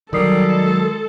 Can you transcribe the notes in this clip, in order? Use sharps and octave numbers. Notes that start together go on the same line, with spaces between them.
D#3 F#3 G3 A4 A#4 D#6 C7
G#3